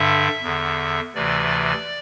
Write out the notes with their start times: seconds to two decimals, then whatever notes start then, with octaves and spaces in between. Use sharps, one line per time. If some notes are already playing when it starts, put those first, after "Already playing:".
Already playing: G2 D3 E5
0.42 E2 D3
1.15 D2 C3 E3 D5